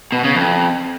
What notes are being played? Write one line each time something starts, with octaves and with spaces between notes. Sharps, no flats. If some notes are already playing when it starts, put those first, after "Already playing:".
B2
C#3
F2